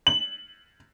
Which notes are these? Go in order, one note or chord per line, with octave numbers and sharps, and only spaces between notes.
F#7